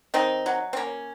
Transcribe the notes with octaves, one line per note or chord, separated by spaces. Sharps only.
D#3 C4 D#4
F#3
C4
A#3 C#4